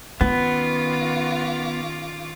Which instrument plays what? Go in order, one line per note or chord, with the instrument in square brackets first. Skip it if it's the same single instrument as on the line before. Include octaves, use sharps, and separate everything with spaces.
[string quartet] D#3 F4 D6 [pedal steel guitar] B3 [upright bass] C#4